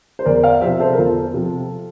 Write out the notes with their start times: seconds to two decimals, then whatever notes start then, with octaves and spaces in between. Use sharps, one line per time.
0.19 C5
0.25 E2 A#4 D5
0.44 D5 F5
0.62 C3 F3 C5 E5
0.80 A4 C5
0.93 A#4
0.98 E2 F4 A4
1.34 C3 F3